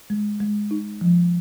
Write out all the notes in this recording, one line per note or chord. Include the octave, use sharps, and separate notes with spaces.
G#3
G#3
D#4
F3